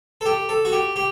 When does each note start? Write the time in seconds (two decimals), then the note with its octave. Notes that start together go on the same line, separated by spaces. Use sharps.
0.21 A4
0.25 G4
0.49 A4
0.65 F#4
0.72 G4
0.96 G4